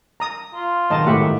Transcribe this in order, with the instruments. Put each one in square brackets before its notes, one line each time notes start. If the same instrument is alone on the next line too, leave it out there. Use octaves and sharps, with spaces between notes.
[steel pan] A#5 D#6
[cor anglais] F4
[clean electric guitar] B1 G#2 D#3 [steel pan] D#5 A5
[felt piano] A2 [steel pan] G4 E5 F#5